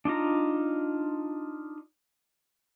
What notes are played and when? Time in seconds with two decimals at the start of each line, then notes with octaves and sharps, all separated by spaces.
0.05 D4 D#4 F4 A#5